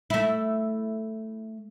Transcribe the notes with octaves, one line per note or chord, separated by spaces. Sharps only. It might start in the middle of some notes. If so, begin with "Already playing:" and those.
A3 E4